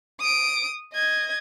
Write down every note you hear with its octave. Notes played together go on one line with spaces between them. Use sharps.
D#6 D7
D#5 G#6